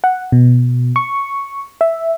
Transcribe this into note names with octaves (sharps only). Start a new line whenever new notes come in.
F#5
B2
C#6
E5